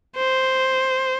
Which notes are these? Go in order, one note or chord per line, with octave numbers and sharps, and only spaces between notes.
C5